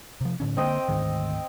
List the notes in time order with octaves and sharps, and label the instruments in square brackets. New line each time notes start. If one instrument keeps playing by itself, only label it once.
[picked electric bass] C3 F3
A2 D3 C#4
[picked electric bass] D3 A#3 [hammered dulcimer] C4 D#5 G5
[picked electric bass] D2 G#2 D#3